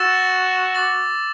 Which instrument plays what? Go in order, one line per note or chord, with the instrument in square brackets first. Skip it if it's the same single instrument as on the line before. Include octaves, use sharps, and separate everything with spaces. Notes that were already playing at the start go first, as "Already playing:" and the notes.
Already playing: [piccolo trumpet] F#4 [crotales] E6 A6 E7
[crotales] D6 A6 F#7